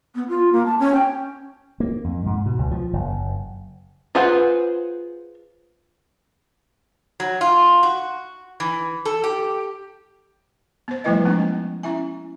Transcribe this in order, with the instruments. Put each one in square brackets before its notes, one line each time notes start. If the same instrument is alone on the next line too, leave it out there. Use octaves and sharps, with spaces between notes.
[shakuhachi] B3
F4
A#3
A5
C#4
G5
[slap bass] A#3
F2
G#2
B2
C#2
F3
F#1
[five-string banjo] F4 G#4 B4 C5 F#5
[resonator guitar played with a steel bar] F#3
F4
F#4
E3
A4
G4
[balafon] B3 C5
F3 G3 A3 E4 B4 D#5
G#3 B3 C#4 D#4
A#3
C#4 E4 E5 G#5